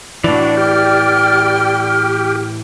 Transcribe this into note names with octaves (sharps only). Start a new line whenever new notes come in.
A2 E3 D4 F#4 D5
G4 G5 F6